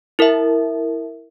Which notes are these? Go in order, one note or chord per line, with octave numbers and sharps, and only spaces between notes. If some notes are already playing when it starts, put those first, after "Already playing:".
E4 A#4 E5